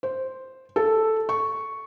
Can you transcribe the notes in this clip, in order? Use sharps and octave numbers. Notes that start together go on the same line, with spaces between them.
C5
A4
C#6